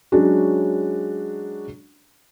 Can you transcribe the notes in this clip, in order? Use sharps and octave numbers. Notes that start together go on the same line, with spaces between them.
F#3 G#3 C#4 D4 F#4